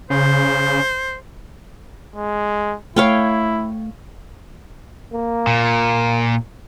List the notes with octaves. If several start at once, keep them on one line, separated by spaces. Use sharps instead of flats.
C#3 C5
G#3
A3 E4 C#5 F5 G5
A#3
A#2